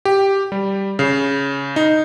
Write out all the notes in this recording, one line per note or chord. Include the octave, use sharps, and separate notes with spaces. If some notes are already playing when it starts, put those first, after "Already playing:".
G4
G3
C#3
D#4